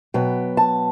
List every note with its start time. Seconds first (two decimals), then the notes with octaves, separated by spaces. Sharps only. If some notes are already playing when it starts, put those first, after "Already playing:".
0.14 B2 F#3 B3 G5
0.57 A5